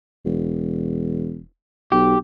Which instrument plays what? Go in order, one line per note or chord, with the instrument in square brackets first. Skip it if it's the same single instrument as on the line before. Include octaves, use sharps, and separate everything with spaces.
[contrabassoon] E1
[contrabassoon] B1 [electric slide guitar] G4